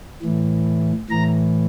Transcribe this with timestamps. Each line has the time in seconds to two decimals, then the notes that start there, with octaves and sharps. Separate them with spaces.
0.22 A2 E3
1.10 A2 E3 A#5